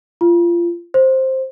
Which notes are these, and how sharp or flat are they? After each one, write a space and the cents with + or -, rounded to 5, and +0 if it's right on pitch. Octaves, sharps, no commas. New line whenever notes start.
F4 -25
C5 +10